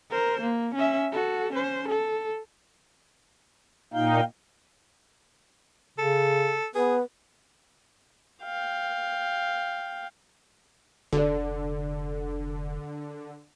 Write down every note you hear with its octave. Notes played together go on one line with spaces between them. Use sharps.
A#4 C5
A#3
C#4 E5
F#4 A4
C#4 C5
A4
A#2 D#4 F5 G5
C#3 A4
B3 G#4 B4
F5 G5
F1 D3 A4 D5